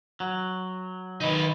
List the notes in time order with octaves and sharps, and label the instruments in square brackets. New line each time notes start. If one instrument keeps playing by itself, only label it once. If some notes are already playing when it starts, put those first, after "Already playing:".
[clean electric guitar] F#3
[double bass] D#3 [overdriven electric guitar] D#4 B4